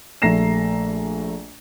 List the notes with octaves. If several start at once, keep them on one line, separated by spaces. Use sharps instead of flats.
A#1 A3 A#5 A#6 C7 E7